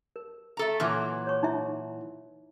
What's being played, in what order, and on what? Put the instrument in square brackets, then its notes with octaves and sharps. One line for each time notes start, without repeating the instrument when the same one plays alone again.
[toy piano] A#4
[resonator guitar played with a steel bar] A3 A4 A#5
[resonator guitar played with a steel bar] A#2 E3 F#3 [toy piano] E6
[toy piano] C#5 C#6
D#4 E4 E5